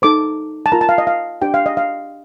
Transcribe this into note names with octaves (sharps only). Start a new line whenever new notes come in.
D#4 A4 C5 D6
A5
F4 A#4 A#5
A5
F5
D#5
F5
D4 G4 C5 G5
F5
D#5
F5